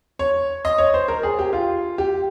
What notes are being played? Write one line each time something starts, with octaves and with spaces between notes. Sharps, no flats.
C#5
D#5
C#5
C5
A#4
G#4
G4
F4
G4